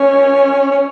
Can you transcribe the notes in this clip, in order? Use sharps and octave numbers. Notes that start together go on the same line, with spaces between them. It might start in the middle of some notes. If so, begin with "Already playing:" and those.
Already playing: C#4
C#4